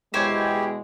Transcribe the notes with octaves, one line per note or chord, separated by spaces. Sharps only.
E2 B2 G#3 E4 G4 C5 C#5 G5